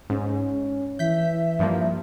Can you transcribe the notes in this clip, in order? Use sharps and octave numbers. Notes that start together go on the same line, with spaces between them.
G#2 C#4
E3 E5 G6 B6
G2 F3 A#3